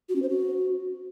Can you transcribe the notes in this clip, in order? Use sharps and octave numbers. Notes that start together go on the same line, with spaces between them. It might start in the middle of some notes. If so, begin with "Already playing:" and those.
F#4
C#4
C5
F#4